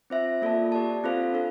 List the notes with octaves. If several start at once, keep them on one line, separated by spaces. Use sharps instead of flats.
C4 F4 C5 E5
A#3 F4 A4 D5 A5
G4 D5 A5
C4 F4 A4 C5 F5
D4 A4